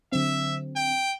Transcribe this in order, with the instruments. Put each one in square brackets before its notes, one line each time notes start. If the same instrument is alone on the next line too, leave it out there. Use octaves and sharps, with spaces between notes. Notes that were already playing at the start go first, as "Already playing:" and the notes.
[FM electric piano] D3 F#3 C4 [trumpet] E5
[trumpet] G5